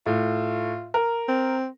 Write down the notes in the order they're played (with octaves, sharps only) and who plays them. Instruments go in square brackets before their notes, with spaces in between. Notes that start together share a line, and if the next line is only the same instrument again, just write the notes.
[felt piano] A2 [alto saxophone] F4
[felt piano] A#4
[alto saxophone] C4